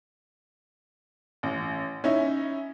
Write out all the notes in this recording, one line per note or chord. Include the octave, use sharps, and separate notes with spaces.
A1
C#4 D#4 E4